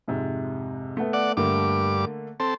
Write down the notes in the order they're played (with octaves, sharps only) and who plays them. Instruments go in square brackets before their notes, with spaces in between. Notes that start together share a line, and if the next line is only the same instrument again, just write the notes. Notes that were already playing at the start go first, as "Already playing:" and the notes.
[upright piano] F2 G#2 C3
A3 B3
[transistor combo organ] D5 F#5
[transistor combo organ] G2 D6 [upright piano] D3 A3 A#3
[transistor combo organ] C4 A4